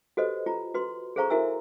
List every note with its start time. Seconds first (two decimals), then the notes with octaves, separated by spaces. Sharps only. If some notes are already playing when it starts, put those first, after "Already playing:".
0.17 F#4 G4 A4 B4 C5 D#5
0.46 F4 A#5
0.74 F#4 B4 C6
1.16 G#4 A4 C5 F5 A#5 C#6
1.30 E4 F#4 A#4 E5 G#5 E6